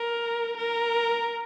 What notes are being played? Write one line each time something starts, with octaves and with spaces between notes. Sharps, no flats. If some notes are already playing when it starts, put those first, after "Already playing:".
Already playing: A#4
A#4